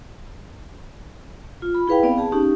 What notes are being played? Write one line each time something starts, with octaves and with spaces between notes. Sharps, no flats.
F4
B5
E4 G#4 B4 F5 G5
B3 C4 D5 F5 B5
G#4 A5
C#4 D#4 G4